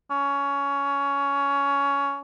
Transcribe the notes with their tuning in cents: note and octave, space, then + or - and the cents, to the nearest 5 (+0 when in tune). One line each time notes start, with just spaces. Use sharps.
C#4 +15